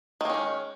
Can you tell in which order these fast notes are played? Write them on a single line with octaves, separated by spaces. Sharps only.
D#3 A#3 C#4 G#3